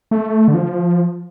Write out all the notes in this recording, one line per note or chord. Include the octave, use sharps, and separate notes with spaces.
A3
D3
F3